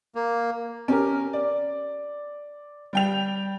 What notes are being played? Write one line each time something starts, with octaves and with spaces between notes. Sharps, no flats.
A#3
C#4 G4 A#4
D5
G3 G5 F7